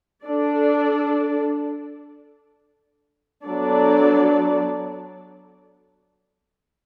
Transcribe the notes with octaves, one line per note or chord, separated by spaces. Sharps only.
D4 A4 D5
F#3 B3 D4 A4 D5